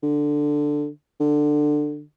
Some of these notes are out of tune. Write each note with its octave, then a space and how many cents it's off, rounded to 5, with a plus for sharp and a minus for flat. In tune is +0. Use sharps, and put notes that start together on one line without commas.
D3 +5
D3 +15